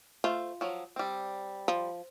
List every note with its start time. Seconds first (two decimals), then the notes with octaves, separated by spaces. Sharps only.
0.24 A3 F4 C5
0.61 F3 F#3
0.96 G3 C4
1.68 F3